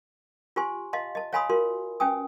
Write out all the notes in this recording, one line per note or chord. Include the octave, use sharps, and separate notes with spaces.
F4 G4 C5 G#5 C6
D#5 F5 A5 C6
D#5 A5
C#5 F5 G#5 B5 C6 D#6
F4 F#4 A#4 C6
C#4 B4 G5 G#5 D#6